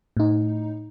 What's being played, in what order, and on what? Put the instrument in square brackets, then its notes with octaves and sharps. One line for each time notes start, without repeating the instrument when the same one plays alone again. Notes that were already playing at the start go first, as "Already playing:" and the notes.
[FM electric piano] A2 D#4